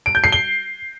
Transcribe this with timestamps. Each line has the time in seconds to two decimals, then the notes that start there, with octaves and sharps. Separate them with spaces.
0.06 D7
0.15 G6
0.24 C7
0.32 G7